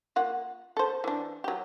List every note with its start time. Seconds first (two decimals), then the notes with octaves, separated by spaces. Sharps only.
0.16 A#3 F4 F#5
0.77 A4 C5
1.04 E3 D4
1.44 F#3 G4